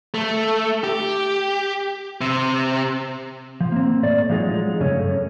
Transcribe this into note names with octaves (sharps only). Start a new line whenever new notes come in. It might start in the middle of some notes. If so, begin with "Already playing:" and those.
A3
G4
C3
F3
A#3 C4
A2 D5
F3 F#3 G#3 D#4
F#2 C#3 A3 C#4
F#2